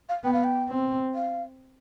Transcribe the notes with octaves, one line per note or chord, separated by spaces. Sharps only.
F5
B3 G5
F5
G5
C4
F5